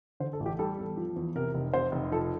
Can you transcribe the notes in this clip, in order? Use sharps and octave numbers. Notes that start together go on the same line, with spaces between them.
D3 C5
A4
A1
G4
G3 A4
E2
F3
E2
C3 A#4
F1
C3 C5
F1
F3 A4